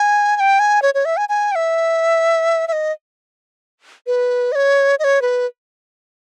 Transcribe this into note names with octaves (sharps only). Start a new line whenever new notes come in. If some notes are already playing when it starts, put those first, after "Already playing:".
Already playing: G#5
G#5
G5
G#5
C#5
C#5
E5
G#5
G#5
G5
E5
E5
D#5
B4
D#5
C#5
D#5
C#5
B4